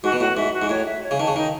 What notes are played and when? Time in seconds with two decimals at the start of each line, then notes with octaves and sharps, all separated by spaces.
0.03 G#2 F#4
0.12 B2
0.20 A2 F#4
0.36 G#2 E5
0.54 F#4
0.62 G#2
0.69 A2 C#5
0.86 E5
1.03 C#5
1.11 C#3
1.20 D#3 A5
1.27 C#3
1.36 D#3 D#4